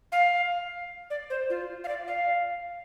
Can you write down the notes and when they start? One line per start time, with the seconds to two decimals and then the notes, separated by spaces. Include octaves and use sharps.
0.12 F5
1.10 D5
1.30 C5
1.50 F4
1.84 F5
1.88 D5
2.08 F5